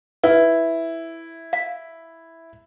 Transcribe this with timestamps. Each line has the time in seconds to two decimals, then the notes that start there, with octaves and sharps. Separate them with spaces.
0.24 E4 B4
1.53 F5 B6